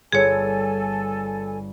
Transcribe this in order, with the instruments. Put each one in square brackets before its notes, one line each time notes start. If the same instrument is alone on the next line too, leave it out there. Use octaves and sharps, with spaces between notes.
[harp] G1 [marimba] G#4 C#5 [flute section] A4 G#5